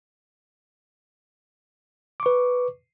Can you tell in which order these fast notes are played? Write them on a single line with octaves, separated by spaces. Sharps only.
D6 C#6 B4